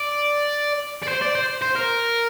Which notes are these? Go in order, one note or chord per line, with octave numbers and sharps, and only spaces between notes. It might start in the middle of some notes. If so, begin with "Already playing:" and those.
Already playing: D5
D5
C5
D5
C5
C5
A#4